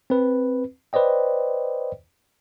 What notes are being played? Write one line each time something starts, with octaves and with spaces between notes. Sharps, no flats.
C4 B4
B4 C5 D5 D#5 G5